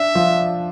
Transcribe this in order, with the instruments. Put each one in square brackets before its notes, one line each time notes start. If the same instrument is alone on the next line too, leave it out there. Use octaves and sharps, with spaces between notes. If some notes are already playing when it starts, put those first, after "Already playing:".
Already playing: [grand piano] D4 [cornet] E5
[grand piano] F3